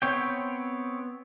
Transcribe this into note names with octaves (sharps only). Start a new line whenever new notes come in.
B3 C4 C#5 G5